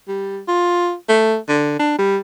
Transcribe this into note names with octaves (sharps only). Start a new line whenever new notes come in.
G3
F4
A3
D3
D4
G3